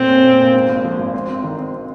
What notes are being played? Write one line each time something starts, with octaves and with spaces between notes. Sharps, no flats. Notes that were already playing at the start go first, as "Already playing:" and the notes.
Already playing: F1 A#2 C4
C#4
A#2
A#2
G#2
G#1
F3
G#1
C4
C4
D#3
C4